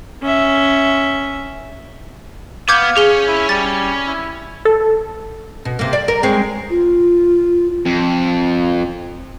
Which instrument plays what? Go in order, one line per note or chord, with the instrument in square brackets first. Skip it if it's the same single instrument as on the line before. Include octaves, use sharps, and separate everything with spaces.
[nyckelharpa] C#4 E5
[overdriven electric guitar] B3 [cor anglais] F5 [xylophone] D6 G6 G#6
[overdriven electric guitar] C#4 C#5 [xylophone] G#4 G7
[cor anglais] E4
[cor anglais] G3 [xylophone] A6
[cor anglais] E4
[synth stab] A4
[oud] B2
C3 A#3
D5
A#4
G#3 C4 C#4
[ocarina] F4
[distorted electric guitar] F2